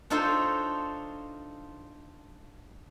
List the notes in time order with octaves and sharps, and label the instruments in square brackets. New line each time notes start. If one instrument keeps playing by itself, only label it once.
[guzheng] D4 D#4 F4 A4 C5 C#5